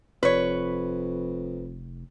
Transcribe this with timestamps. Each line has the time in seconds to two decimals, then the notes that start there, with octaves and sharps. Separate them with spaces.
0.23 F1 F2 B4 C#5